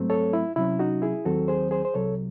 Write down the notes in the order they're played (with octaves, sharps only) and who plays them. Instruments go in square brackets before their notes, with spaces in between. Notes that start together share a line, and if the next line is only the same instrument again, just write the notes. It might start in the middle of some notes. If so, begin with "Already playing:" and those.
Already playing: [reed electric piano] G#2 F#3 A3 C4
A4 C#5
E4
C3 F#3 C#4 E4
D#4 F#4
E4 G#4
D#2 D#3 F#3 C4 F#4 A4
G#4 C5
G#4 C5
C5
C2 C3 F#3 A4 C#5